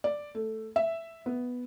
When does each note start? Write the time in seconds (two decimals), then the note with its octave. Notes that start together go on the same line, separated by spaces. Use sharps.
0.04 D5
0.35 A3
0.76 E5
1.26 B3